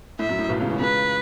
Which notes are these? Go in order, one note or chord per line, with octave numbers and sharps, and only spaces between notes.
A2 E5
F#2
A2
B1 B2
C#2 C#3
E2 E3
C#2 C#3 B4